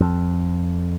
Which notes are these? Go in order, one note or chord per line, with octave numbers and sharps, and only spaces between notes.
F2